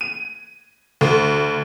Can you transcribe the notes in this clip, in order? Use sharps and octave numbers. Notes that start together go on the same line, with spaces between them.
D#7
D2